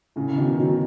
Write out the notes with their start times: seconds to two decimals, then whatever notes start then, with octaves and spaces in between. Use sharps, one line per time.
0.16 A2 C#3
0.37 B2 D#3
0.58 D#3 F#3